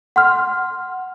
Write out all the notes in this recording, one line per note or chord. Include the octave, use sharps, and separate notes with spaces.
F#5 C6 F6